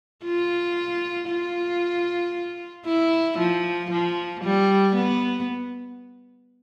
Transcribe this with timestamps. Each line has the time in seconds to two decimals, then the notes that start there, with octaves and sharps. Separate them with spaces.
0.25 F4
1.29 F4
2.86 E4
3.38 F3
3.91 F3
4.44 G3
4.96 B3